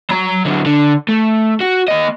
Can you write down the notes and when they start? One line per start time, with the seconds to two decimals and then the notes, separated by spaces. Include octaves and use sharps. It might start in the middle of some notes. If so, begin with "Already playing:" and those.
0.10 F#3 A#5
0.45 D3 F#3
0.66 D3
1.08 A3
1.61 F#4
1.88 A#3 D#5